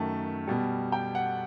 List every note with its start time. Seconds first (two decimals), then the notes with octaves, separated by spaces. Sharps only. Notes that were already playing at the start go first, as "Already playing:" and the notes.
Already playing: F#2 D#3 A3 A5
0.47 B2 G3
0.92 G5
1.15 F#5